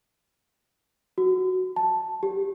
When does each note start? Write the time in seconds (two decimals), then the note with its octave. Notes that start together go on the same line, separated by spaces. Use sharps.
1.18 F#4
1.76 A5
2.23 G4